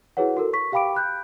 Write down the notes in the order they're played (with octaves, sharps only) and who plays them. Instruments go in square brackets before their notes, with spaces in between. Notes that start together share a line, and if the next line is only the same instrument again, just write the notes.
[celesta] E4 F#4 G#4 B4 C#5 F#5
F#4 A4 A#4
C#6 B6
G4 F5 G5 B5 D6 D7
B5 F#6 G6